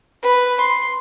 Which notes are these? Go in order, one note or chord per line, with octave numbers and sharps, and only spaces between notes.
B4
C6